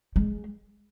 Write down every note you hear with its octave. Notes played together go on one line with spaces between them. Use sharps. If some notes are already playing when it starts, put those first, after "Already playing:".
G#3